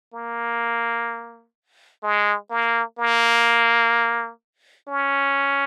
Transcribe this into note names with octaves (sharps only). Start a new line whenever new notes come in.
A#3
G#3
A#3
A#3
C#4